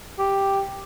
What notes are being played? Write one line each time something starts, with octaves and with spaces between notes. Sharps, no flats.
G4